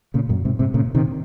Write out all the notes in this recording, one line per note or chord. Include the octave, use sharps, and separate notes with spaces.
A#2 C#3
F#2 A#2
G#2 C3
G#2 C3
A#2 C#3
C3 D#3